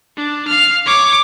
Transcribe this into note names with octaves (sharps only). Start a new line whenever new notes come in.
D4
F5 F6
C#5 D6